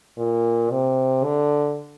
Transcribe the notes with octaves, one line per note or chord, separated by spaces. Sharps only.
A#2
C3
D3